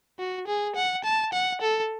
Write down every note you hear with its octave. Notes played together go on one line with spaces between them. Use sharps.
F#4
G#4
F#5
A5
F#5
A4